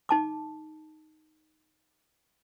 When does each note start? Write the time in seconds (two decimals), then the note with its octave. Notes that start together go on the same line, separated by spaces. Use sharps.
0.09 D#4 A5 D6